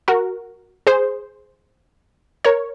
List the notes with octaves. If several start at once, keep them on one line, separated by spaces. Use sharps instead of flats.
F#4 A#4
G#4 C5
A#4 C#5